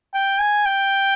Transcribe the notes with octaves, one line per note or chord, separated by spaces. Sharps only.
G5
G#5
G5